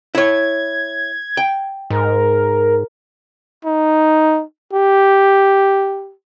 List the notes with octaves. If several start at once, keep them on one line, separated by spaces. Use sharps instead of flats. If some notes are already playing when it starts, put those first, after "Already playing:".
E4 C#5 G#6
G5
G#2 A#4
D#4
G4